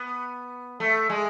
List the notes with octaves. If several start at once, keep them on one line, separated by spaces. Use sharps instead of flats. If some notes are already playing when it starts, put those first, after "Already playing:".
Already playing: B3
A3
G#3